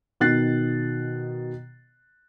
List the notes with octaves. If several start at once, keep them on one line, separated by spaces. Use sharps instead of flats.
B2 D#3 F#6 A6 C7